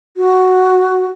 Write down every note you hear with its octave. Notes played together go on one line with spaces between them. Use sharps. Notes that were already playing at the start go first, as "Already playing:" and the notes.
F#4